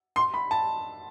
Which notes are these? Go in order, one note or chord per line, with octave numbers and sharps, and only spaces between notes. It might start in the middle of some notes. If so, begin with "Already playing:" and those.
C6
B5
A5